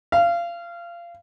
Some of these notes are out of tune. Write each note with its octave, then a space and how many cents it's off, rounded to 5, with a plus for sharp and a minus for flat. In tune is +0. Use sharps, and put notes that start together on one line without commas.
F5 -25